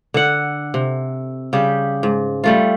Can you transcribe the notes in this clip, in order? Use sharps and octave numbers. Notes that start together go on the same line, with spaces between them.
D3 F#5
C3
C#3 G3 G4
G#2
G3 A3 F4